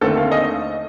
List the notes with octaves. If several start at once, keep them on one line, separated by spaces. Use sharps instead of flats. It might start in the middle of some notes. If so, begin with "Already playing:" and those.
D#2 D3 A3 C4 A4
F5
D#5